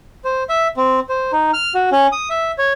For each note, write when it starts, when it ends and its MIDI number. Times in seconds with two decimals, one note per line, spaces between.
0.24 0.43 72
0.49 0.68 76
0.77 1.00 60
1.09 1.32 72
1.33 1.51 63
1.53 1.73 89
1.74 1.89 66
1.92 2.07 61
2.12 2.29 87
2.30 2.51 76
2.58 2.73 73